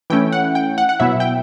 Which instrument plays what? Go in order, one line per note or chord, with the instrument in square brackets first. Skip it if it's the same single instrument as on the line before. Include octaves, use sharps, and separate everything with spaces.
[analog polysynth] E3 A3 C#4 E4 G5
F#5
G5
F#5
F#5
B2 F#3 B3 E4 E5
G5